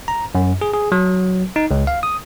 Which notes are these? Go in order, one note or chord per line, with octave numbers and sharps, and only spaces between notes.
A#5
F#2
G#4
G#4
F#3
D#4
C#2
F5
D#6